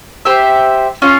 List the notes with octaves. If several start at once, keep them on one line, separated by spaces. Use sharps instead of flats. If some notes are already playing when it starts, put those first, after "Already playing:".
G4 C5 E5
C#4 F4